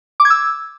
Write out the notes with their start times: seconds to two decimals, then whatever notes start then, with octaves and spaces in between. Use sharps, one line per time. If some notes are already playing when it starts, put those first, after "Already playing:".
0.20 D6
0.25 G#6
0.30 E6